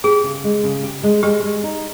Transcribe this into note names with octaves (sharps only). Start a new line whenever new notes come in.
G4 G#4
C#3
G#3
C#3
G4
G#3
G#3 G4
G#3
D#4